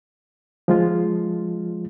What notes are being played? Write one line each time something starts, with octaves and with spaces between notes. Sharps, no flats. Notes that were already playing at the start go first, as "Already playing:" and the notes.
F3 G#3 F4